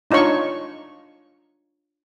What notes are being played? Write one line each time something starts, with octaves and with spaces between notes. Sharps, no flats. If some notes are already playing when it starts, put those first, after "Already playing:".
D4 D#4 F4 C#5 C#6